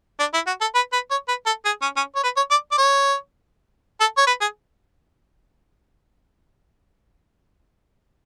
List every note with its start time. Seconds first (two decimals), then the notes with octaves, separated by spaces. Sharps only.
0.20 D4
0.34 E4
0.47 F#4
0.61 A4
0.75 B4
0.93 B4
1.11 C#5
1.28 B4
1.46 A4
1.65 G#4
1.82 C#4
1.96 C#4
2.15 C#5
2.24 B4
2.37 C#5
2.51 D5
2.72 D5
2.78 C#5
4.00 A4
4.17 C#5
4.27 B4
4.41 G#4